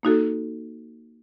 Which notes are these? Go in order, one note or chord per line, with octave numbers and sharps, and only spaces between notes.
A#3 D#4 F#4 A4